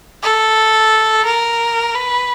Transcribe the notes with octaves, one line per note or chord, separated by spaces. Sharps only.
A4
A#4
B4